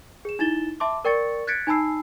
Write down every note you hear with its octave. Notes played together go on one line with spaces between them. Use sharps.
G#4 E7
D#4 E4 A6 E7 G7
E5 A5 C6 D6
A#4 D5 G5 C#6 A6 C#7
F#6 G#6 A6 B6 C#7 D7
D#4 G#5 A5 B5 E6 C7